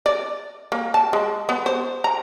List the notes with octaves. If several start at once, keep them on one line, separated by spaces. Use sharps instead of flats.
D5
A#3
A5
G#3
B3
C5
A#5